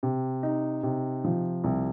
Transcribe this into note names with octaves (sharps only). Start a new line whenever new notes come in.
C3
D#4
C3
F3
C2